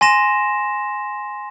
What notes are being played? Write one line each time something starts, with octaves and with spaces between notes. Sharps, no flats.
G#5 C6 A#6 E7